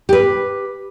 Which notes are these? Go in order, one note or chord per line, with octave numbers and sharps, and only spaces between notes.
G4 B4